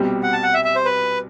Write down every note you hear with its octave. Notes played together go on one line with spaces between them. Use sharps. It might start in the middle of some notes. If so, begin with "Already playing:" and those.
Already playing: C2 B2 G3 C4 G4
F#5
A5
F#5
E5
E5
C5
B4